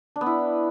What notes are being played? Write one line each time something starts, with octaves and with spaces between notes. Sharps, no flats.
D4
B3
E4